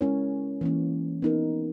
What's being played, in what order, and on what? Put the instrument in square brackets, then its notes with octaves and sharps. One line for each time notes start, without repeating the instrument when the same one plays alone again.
[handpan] G#3 C#4 E4 A#4 C#5
E3 A#3 C#4
B3 D#4 A#4